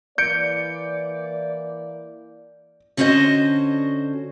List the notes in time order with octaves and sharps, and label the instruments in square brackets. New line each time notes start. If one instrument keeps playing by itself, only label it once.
[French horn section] E3 A#3 D5 [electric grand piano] G6 C#7 D7
[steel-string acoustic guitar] D3 C#4 F#4 G4 C5 D#5